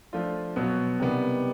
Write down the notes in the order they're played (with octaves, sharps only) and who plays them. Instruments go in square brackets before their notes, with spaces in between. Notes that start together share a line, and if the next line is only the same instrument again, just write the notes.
[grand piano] F3 A3 D4 F4
B2 F#3 B3
C3 D#3 G3 B3